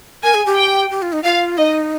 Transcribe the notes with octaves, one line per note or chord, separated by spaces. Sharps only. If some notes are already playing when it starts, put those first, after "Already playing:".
A#4 G#5
G#4
G4
G5
G4
F4
D#4
F4 F5
D#4 D#5